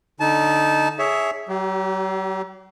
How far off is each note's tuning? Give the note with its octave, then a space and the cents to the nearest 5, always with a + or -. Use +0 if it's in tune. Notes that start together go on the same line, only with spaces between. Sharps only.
D3 +0 D#4 +0 A5 -25
G#4 +0 C#5 +15 E5 -5
F#3 +40 G4 -25